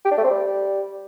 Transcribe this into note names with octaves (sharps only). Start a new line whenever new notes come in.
G4
D4
A3
C4
G3